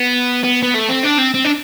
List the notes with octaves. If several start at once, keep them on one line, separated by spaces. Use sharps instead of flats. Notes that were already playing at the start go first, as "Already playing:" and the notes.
Already playing: B3
B3
B3
A3
C4
D4
C4
C4
D4